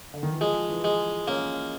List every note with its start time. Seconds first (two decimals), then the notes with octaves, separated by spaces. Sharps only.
0.14 D3
0.23 D#3
0.32 E3
0.41 F3 G#3
0.70 E3
0.84 G#3
1.28 A#3 C#4